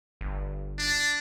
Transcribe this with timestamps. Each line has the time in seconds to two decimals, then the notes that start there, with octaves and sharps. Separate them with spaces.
0.21 G1
0.79 D4